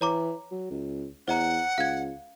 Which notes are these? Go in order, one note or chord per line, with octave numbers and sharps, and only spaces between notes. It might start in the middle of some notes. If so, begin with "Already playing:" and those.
E3 C#5 A#5 D6
F#3
C#2
E2 C5 D#5 F#5 A#5
C#2 F5 G#6